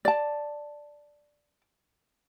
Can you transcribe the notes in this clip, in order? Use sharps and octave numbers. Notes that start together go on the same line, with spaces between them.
D5 A5